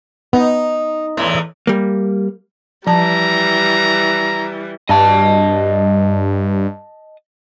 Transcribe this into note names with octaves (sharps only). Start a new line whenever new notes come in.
B3 D#4
E2 A2 E3
G3 A#3
E3 F3 G3 A5 A#5
G2 D#5 A5